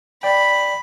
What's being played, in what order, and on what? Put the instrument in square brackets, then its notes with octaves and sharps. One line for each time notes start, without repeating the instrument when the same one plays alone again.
[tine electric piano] D5 G5 [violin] B5